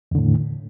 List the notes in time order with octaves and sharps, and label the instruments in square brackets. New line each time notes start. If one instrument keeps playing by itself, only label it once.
[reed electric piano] E2
D3
A2